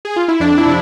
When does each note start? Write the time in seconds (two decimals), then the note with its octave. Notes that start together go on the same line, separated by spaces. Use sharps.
0.05 G#4
0.16 F4
0.28 E4
0.40 F2 D4
0.58 E4
0.66 C3